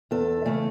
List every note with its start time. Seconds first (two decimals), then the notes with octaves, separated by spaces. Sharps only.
0.11 E2 A4
0.45 C#3 E3 A3